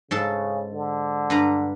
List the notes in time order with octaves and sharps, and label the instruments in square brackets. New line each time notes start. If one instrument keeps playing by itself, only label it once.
[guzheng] G#2 A4 A5 [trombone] C#3
[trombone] D3
[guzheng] G2 B4 A#5